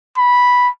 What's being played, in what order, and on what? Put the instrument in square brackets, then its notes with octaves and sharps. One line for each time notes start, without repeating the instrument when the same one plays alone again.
[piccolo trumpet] B5